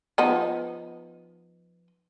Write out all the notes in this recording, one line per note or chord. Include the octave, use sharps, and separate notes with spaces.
F3 B3 D#4